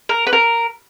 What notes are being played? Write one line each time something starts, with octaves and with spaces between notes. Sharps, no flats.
A#4
B4
A#4